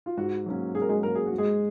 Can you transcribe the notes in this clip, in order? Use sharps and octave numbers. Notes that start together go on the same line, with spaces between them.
F4
G#2 F#4
F#3 A#3 C#4
G#2 G#4
A#4
G#3 G#4
F#3 A#3 C#4 A#4
G#4
F#4
G#2
G#3 G#4